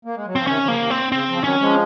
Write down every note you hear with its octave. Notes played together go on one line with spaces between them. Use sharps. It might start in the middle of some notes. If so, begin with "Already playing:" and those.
A#3
G#3
F#3
F3 C4
C3 D#3 C#4
C#3 F3 A#3
C3 D#3
C4
C#3 C4
C#3 F3
D#3 F#3 C#4
F3 G#3